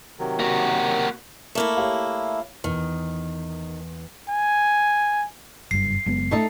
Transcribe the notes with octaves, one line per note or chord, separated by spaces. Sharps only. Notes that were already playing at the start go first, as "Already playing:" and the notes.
C3 D#3 F#3
A#3 F#4
A3 A#3 E4
G4 C#5 F5
E2 D#3
G#5
F#1 G2 C7
F#1 G#3 B3
A3 D#4 A4